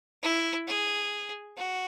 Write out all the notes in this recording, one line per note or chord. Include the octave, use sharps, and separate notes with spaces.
E4
G#4
F#4